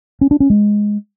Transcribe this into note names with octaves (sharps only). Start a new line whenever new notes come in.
C#4
D4
C#4
G#3